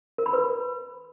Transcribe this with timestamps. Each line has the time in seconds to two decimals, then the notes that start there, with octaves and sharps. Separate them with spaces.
0.18 A#4
0.26 B5
0.33 B4